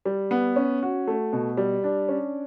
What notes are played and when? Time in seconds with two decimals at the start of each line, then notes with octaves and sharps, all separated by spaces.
0.05 G3
0.31 B3
0.56 C#4
0.83 F#4
1.07 A3
1.33 B2
1.57 G3
1.84 D4
2.09 C#4